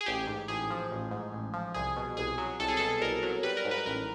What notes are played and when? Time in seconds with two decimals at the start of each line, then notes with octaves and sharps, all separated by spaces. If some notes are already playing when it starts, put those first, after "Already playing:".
0.01 G#4
0.06 A1 G4
0.27 G#2
0.48 A1 G#4
0.70 F3
0.91 A1
1.11 G#2
1.33 A1
1.54 F3
1.74 C2 G#4
1.97 B2
2.17 C2 G#4
2.38 F#3
2.60 C2 A4
2.68 G#4
2.77 B2 A4
3.01 C2 A#4
3.23 F#3
3.43 G3 B4
3.57 A#4
3.65 G#2
3.71 B4
3.86 A1 A#4